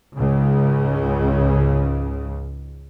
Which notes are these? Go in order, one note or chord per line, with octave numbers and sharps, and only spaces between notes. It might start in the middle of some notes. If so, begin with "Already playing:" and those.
C#2 G#2 C#3